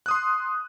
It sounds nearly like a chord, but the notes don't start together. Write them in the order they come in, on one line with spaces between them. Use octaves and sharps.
F#6 D#6 C6